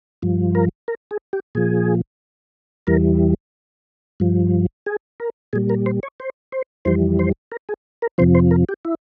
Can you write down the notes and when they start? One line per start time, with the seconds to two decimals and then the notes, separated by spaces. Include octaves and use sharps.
0.22 G2 F3
0.55 A#4
0.88 A#4
1.11 G#4
1.33 G4
1.55 A#2 F3 G#4
2.87 E2 E3 G3 A#4
4.20 G2 F3
4.86 G#4
5.20 A#4
5.53 A#2 G3 G#4
5.70 A#4
5.86 C5
6.03 C#5
6.20 C5
6.52 C5
6.85 F2 E3 G3 C5
7.19 C5
7.52 A#4
7.69 G#4
8.02 A#4
8.18 F2 C3 F3 C5
8.35 C5
8.51 A#4
8.69 G4
8.85 E4